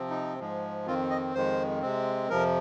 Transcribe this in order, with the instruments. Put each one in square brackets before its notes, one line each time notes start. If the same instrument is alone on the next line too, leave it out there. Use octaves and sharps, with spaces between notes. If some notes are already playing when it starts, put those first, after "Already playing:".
Already playing: [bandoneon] C3 F3 C4
D#4
G#2 F3 G#3
F2 D#3 C4 F4
D#5
F2 D#3 G#3 C5
C3 G#3 C4
F2 C3 F3 A#4